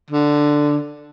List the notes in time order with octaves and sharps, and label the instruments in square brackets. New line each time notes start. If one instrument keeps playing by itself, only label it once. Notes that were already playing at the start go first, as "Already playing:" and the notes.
[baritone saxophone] D3